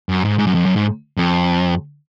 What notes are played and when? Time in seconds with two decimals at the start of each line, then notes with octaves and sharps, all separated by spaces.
0.09 F#2
0.25 G#2
0.39 G#2
0.47 F#2
0.55 F2
0.66 F#2
0.76 G#2
1.17 F2